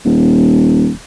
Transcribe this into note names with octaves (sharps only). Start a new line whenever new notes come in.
D#1